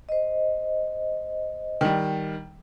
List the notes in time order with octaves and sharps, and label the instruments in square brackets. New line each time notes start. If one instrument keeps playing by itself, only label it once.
[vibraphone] C5 D#5
[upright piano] D#3 G3